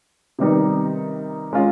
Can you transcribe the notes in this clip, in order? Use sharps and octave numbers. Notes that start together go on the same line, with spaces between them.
C3 D#3 G3 B3 D#4
G#3 C#4 F4